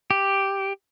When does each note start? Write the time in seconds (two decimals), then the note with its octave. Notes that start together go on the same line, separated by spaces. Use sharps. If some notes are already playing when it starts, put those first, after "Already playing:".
0.11 G4